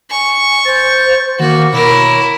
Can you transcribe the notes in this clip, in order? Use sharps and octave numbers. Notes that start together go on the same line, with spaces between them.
G#5 C#6
C5 A6
D#3 A#3 F#4
B2 E4 A#4 C#5